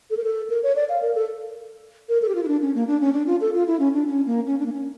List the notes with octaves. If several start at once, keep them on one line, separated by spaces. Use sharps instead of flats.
A4
A#4
A4
A#4
C#5
D5
F5
A#4
A4
A#4
A4
G4
F4
E4
D4
C#4
A#3
D4
C#4
D4
F4
A4
F4
E4
C#4
D4
C#4
A#3
C#4
D4
A#3
C#4